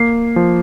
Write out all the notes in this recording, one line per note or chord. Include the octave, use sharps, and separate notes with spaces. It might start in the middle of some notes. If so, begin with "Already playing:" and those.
Already playing: A#3 C7
F3